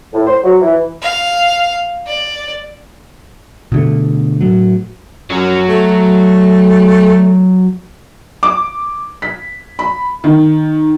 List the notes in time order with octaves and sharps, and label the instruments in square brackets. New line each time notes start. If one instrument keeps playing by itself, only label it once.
[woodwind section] A2
C5
F#3
E3
[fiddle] F5
D5
[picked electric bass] B2 D3 A3
A2 F#3
[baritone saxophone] F#2 [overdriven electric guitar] F#3
[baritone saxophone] A3
[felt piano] D6
B6
B5
D#3